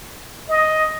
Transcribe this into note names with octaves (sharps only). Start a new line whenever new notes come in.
D#5